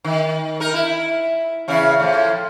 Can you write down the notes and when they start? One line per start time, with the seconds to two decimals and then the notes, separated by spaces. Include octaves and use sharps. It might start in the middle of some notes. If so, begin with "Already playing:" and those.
0.04 D#3
0.60 D#4 A#4
0.74 E4
1.68 E2 C#3 E4
2.00 A2 F3